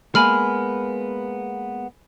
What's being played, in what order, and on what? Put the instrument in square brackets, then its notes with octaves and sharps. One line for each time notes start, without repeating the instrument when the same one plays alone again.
[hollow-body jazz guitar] G#3 A#3 B3 [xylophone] G#5 B5 F6